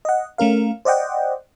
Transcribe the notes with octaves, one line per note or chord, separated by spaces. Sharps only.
D#5 F#5
A3 C#4 A#4 F5
C5 D5 D#5 F#5 G5